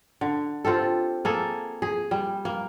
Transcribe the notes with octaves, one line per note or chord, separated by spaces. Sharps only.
D3
C4 F4 G4 A4
A#3 G#4 A4
G#4
G3
A#3